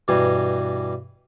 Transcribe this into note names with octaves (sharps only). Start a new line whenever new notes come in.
G2 B2 E3 G3 G#5